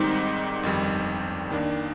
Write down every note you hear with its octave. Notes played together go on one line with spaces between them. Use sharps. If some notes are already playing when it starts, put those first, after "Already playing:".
Already playing: G#2 D#3 G3 C4 D#4
G1 F2 D#3 G3
D#2 D#3 A#3 D4